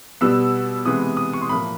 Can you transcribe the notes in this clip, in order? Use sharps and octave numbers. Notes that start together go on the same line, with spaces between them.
B2 G3 B3 E6
C3 E3 G#3 B3 D#6
D#6
C#6
C6
A2 F3 A#3 B5